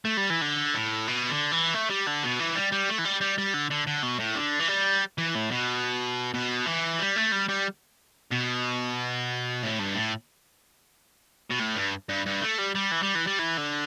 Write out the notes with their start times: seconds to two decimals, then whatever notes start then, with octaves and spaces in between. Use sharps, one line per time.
0.05 A3
0.17 G3
0.30 E3
0.42 D3
0.74 A2
1.07 B2
1.30 D3
1.51 E3
1.74 A3
1.90 G3
2.06 D3
2.23 B2
2.39 E3
2.55 G3
2.72 G3
2.89 A3
2.98 E3
3.05 G3
3.21 G3
3.38 G3
3.54 D3
3.71 D3
3.87 D3
4.03 B2
4.20 A2
4.36 D3
4.60 E3
4.69 G3
5.18 E3
5.35 A2
5.51 B2
6.34 B2
6.66 E3
6.99 G3
7.16 A3
7.32 G3
7.49 G3
8.31 B2
9.63 A2
9.79 G2
9.95 A2
11.51 B2
11.60 A2
11.76 G2
12.09 G2
12.26 G2
12.41 A3
12.58 G3
12.75 G3
12.91 E3
13.03 G3
13.15 E3
13.27 G3
13.39 E3
13.57 D3